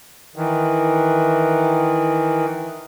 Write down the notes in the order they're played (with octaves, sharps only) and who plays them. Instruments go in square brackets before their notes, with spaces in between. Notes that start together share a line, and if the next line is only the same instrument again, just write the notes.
[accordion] D#3 E3